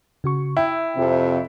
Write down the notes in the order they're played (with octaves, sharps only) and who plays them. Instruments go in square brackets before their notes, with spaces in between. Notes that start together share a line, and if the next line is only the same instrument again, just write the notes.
[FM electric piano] C#3 F#4 C#6
[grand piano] E4 [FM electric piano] E5 G5
[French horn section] F2 C3